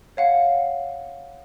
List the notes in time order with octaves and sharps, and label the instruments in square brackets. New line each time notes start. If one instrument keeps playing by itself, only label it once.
[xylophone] C#5 F5 F#5